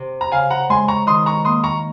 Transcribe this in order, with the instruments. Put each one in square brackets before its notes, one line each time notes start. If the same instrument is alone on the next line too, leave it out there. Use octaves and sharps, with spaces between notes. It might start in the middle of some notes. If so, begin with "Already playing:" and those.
Already playing: [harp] C3
[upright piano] A#5
[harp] C#3 [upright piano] F5 G#5
[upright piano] F#5 A#5
[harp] G#3 [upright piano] G#5 C6
[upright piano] A#5 C#6
[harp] D#3 [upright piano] C6 D#6
[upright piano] A#5 C#6
[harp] A#3 [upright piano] C6 D#6
[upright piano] A#5 C#6